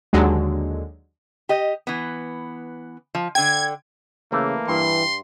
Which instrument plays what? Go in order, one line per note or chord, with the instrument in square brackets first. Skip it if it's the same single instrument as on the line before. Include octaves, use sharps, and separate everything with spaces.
[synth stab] D#2 D3 F#3 G#3
[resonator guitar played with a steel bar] G4 D#5
E3 B3
F3
[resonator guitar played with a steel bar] D3 G5 [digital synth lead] G#6
[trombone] C#3 [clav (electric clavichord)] E3 A3 [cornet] A#3
[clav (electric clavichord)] G2 [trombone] E3 [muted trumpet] C6